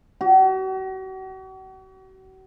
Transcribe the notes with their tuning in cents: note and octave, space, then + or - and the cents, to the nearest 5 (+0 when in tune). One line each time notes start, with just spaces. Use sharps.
F#4 +40